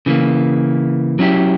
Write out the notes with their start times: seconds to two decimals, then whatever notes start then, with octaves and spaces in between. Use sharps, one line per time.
0.06 C#3 E3 A#3
1.19 F#3 C#4 E4 G4